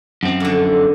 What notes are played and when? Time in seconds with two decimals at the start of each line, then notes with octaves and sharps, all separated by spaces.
0.23 F#2 C4
0.40 F2 D3